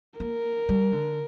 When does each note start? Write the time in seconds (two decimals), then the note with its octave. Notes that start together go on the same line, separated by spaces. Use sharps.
0.20 A#3 A#4
0.69 G3
0.92 D3